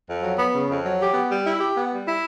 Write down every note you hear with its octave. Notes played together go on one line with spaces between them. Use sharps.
F2
F#3
B3
C#3
F2
F#3
G4
B3
G3
E4
G4
B3
G3
E4